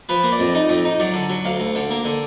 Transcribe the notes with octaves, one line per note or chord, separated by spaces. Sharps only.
F3 B4
A#3
D5
F2
D#4
F2
D#4
F#3 D5
D3
F#3
D2 F5
D2
D3
A#3
D3